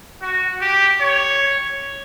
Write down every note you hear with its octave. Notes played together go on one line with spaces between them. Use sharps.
F#4
G4
C#5